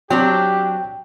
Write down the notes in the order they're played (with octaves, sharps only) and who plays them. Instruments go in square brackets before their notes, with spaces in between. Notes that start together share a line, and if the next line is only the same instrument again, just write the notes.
[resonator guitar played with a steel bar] F#3 C4 D4 [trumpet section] G4 [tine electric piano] G5